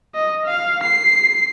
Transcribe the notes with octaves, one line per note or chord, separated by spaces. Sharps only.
D#5
F5
C7